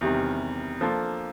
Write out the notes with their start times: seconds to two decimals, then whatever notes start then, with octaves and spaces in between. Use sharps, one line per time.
0.01 E2 C3 D#3 G3
0.81 F3 A#3 D4 F4 A4